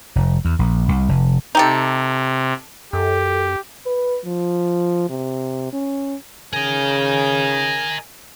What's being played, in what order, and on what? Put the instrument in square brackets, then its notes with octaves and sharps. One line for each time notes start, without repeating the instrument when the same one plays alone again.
[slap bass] F1
E2
A#1
C2
F1
[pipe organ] C3 [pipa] D#4 G4 A4
[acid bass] F#2 [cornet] G4 [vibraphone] A4
[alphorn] B4
F3
C3
C#4
[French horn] C#3 [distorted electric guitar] A#4 D#5 [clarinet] G#5